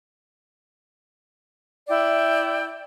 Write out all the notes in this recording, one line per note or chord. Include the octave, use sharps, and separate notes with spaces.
E4 D5 G5